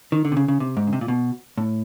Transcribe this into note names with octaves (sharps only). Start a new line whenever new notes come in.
D#3
D3
C3
C#3
C#3
C3
G#2
C#3
C3
A#2
B2
A2